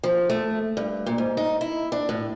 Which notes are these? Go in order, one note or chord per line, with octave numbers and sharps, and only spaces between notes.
F3
A3
G2
A#2
G#2
D#4
E4
D4
A2